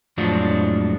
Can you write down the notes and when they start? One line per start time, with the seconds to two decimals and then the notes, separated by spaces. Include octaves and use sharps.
0.18 F2 A2 F3 F#3 G#3 D4